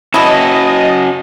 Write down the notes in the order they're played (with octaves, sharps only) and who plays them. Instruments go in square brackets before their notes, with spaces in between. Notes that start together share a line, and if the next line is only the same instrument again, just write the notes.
[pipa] E3 E4 [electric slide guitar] C#4 F#4 A5 [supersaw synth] D#5